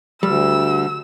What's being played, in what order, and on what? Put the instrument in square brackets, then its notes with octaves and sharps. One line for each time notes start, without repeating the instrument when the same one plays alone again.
[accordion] D2 [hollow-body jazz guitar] G3 [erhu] E6